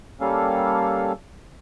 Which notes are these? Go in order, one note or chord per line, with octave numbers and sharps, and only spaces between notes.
G3 A#3 C#4 A4 F5